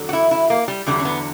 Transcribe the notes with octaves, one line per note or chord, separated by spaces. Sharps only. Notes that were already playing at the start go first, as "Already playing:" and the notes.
Already playing: E2 D3 F#3
F#4
E4
E4
A#3
G3
E2 D3 F#3 G3
C#4
B3